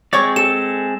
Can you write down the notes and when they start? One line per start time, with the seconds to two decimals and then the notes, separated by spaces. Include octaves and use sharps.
0.13 G#3 C4 C#5 D5 C#6 D6
0.36 A4 E7